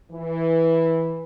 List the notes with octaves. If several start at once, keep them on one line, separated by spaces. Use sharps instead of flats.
E3